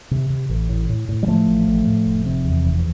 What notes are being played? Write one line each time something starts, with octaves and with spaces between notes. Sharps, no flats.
C3
C3
A1
A2
A2
A2
G3
A2 F3 A3
A1
A1
A2
F1
C3
E2
F1